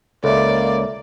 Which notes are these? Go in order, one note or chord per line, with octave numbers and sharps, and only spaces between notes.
C#2 A#3 A4 D5 E5